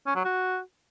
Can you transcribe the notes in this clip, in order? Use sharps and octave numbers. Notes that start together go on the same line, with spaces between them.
C#4
F#3
F#4